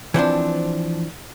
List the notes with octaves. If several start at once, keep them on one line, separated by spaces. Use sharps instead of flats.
E3 F3 C4 D4